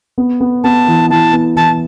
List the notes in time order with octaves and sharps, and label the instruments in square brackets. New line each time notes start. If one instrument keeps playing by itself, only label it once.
[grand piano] B3
B3
[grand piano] B3 [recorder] A5
[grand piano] E3
[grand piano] E3 [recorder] A5
[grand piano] B3
[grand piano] E3 [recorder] A5